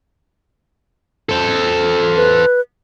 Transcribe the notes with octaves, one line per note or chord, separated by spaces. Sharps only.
A4 C5
B4